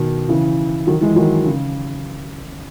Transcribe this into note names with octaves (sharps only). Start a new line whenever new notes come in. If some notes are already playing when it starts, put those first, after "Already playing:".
Already playing: B2 D#3
C#3 E3
D#3 F#3
E3 G#3
D#3 F#3
C#3